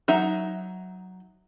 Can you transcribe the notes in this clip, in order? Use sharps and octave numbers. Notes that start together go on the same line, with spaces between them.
F#3 D#4 E5